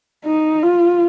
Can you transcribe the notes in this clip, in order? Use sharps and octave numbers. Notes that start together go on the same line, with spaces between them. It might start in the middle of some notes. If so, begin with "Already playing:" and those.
D#4
F4